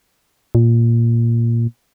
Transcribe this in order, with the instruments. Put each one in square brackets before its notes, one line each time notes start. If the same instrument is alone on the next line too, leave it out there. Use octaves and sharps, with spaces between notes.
[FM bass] A#2